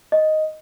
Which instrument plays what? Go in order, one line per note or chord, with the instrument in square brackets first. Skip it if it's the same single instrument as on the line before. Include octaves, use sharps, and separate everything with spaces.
[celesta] D#5